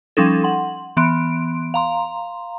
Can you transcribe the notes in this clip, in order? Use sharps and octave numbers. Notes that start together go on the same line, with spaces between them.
F3 G3 C#4 D#4 A4
F#5 C6
E3 B3 C6 D7
F5 A#5 C6